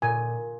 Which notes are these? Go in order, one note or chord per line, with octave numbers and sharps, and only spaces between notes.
A#2 G#5